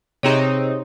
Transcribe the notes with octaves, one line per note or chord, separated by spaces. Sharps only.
C3 C4 D#4 G4 G#4 C#5